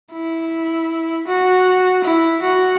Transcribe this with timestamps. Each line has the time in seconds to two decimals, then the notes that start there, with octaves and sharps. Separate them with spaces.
0.12 E4
1.28 F#4
2.04 E4
2.43 F#4